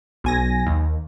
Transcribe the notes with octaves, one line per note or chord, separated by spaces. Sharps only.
B1 G#5 A#6
D#2